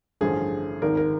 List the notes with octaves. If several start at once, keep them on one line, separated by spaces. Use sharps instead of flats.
A1 G2 D3 F3 G#4
G#1 G#2 D#3 A#4
A#4